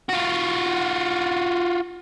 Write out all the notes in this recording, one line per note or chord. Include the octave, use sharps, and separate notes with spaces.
F4 F#4